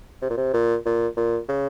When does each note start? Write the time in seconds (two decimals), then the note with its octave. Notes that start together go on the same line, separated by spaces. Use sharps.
0.22 C3
0.30 A#2
0.37 C3
0.54 A#2
0.86 A#2
1.17 A#2
1.48 C#3